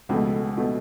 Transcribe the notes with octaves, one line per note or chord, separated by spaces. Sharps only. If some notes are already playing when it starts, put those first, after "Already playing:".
C#2 B2 A3
B2 A3